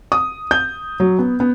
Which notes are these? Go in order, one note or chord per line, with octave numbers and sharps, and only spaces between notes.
D#6
G6
F#3
B3
B3